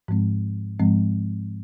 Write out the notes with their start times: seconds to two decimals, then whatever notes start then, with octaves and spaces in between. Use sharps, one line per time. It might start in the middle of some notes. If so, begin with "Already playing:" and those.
0.08 G#2 F3 G#3 C4
0.79 G#2 F3 G#3 C4